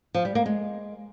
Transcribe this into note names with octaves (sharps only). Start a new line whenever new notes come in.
F3
G3
A#3
G#3